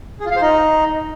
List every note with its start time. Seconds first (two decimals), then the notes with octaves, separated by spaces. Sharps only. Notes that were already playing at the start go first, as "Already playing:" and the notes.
0.20 G#4
0.26 F4
0.31 F5
0.36 C5
0.42 D#4